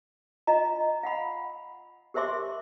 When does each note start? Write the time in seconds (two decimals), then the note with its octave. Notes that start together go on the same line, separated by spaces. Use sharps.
0.47 F4 D#5 A#5
1.03 F5 F#5 B5
2.14 G4 A#4 C5 E5 C6 D6